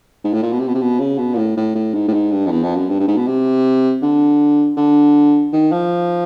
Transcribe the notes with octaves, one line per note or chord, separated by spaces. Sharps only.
G#2
A2
A#2
B2
C3
B2
C3
B2
C#3
B2
A#2
A2
A2
A2
G#2
A2
G#2
G2
F2
E2
F2
F#2
G2
G2
G#2
B2
C3
D3
D3
D#3
F3